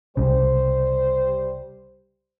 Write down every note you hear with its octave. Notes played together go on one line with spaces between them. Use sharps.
C2 C#3 G3 C5